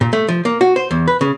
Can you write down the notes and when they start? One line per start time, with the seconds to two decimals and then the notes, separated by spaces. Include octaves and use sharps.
0.01 A#2
0.13 A3
0.28 F3
0.45 A#3
0.61 F#4
0.76 C5
0.91 E2
1.08 B4
1.21 C#3